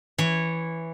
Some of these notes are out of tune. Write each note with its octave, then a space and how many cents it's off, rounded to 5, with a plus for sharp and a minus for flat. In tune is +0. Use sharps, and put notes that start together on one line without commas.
E3 +0 C#5 -10